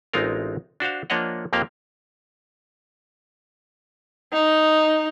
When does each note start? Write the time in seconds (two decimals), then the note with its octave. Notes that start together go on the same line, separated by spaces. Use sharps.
0.13 A1 G#3 C4 D#4 F4 A#4
0.80 D4 F#4 C5 F5
1.10 F3 A#3 D4 C#5 D#5 F#5
1.53 F2 F3 A#3 G4 F5
4.33 D#4